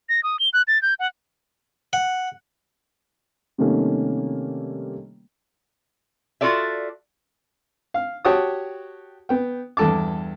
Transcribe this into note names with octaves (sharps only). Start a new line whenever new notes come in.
A#6
D#6
G7
F#6
A6
G6
F#5
F#5
C3 D#3 G3 A3 A#3 C#4
F4 F#4 A4 D5 E5
F5
F#4 G4 C#5 F#5 A5 D#6
B3 G5
E2 G2 A4 A5 D6